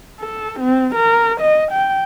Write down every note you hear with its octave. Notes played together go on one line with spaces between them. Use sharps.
A4
C4
A#4
D#5
G5